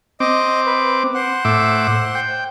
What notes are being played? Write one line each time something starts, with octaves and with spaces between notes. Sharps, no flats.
C4 D#5 D6
B4
C5 F#5
A2 E5 D6
G5